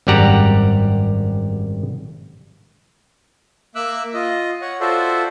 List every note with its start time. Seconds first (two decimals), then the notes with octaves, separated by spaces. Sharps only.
0.07 G#1 F#2 G3 G4 F#5 A#5
3.75 A#3 E5 D6 E6 F#6
4.14 F4 D#5
4.62 C#5 F#5
4.80 F4 F#4 A4 C5 D5 E5